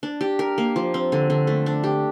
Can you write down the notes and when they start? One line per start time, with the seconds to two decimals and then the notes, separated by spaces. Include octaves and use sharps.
0.03 D4
0.21 G4
0.39 A#4
0.58 A#3
0.76 F3
0.94 C4
1.12 D3
1.30 D3
1.47 A3
1.66 D4
1.84 G4